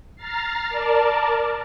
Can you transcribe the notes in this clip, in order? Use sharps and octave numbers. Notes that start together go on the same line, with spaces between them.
A#5 F6 A6 C7
A#4 D5 A5